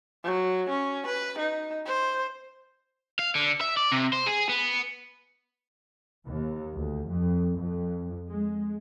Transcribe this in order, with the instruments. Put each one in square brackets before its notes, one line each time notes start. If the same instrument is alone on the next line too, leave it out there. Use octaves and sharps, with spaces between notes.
[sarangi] F#3
C#4
B4
D#4
C5
[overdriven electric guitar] F5
D3
E5
D5
C3
C5
G#4
B3
[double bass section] D#2
D2
F2
F2
G#3